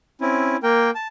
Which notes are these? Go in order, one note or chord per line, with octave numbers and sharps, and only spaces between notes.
C4 C#4 E4
A#3 A#4 G5
A5